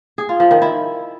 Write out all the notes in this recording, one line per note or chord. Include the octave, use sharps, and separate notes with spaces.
G#4
F4
F3
D#3
E4